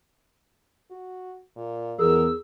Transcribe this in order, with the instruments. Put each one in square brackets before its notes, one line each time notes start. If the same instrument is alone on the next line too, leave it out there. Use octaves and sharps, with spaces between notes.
[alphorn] F#4
A#2
[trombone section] E2 [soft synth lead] G#4 [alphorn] A#4 [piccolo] E6